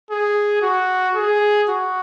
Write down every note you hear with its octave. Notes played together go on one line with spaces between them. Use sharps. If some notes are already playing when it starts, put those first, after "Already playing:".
G#4
F#4
G#4
F#4